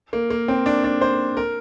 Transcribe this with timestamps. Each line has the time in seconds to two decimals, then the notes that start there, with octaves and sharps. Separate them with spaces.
0.13 A#3
0.30 A#3
0.48 C4
0.66 D4
0.84 D4
1.01 C5
1.37 A#4